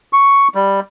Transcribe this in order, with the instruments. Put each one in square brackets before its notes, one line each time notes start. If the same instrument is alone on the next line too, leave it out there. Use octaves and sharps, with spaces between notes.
[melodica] C#6
G3